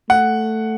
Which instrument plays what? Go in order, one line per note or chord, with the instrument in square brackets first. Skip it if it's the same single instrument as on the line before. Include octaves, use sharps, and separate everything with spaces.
[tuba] A3 [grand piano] F#5